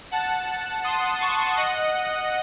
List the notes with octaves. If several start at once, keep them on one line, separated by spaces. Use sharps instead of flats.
F#5 A5
C6 D#6
A5 C#6
D#5 F#5